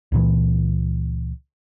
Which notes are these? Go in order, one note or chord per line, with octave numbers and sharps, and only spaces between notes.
C#2 A#2 E3